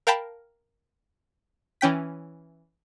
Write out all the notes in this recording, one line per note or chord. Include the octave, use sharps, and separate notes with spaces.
A#4 F5 G5 A5 B5
E3 C#4 G5 B6